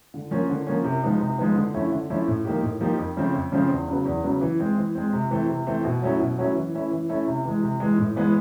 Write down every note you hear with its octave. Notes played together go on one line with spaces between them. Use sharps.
D3
F3 A#3 C#4
D3
F3 A#3 C#4
C3
F3 G#3 B3 D#4
C3
F3 G#3 B3 D#4
D3
F3 A3 C#4 E4
D3
F3 A3 C#4 E4
A2
F3 A#3 D#4 G4
A2
F3 A#3 D#4 G4
F2
C#3 F3 A3 C4
F2
C#3 F3 A3 C4
E2
C#3 F#3 B3
E2
C#3 F#3 B3
E3
G#3 C4
E3
G#3 C4
C3
E3 A3 C4
C3
E3 A3 C4
B2
F#3 A3 C#4 E4
B2
F#3 A3 C#4 E4
E3
A3 C#4 E4
E3
A3 C#4 E4
C3
E3 G#3
C3
E3 G#3
A2
E3 G#3 B3